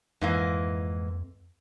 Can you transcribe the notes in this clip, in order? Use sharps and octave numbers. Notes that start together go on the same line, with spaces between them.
F2 G#2 E3 A#3